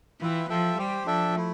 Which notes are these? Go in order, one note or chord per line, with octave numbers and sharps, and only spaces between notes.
E3 F4 B4 E5 G5
F3 F4 A4 E5 G5
G3 G4 C5 G5
F3 D4 A4 E5 G5
A3 E4